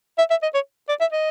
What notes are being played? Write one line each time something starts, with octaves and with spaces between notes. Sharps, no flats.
E5
E5
D#5
C#5
D5
E5
D#5